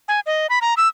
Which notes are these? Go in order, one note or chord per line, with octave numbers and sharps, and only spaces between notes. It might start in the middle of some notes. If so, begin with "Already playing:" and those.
G#5
D#5
B5
A#5
E6